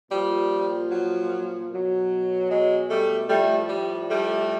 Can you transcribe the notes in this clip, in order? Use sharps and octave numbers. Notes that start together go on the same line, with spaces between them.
A#2 F3 G3
F#3
B2 F#3
F#3 G#3
G3 A3
A2 F3 G3 A3
G3
G3 A3